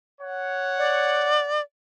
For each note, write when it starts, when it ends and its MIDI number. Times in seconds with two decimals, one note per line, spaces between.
0.21 1.50 73
0.21 1.50 78
0.78 1.61 74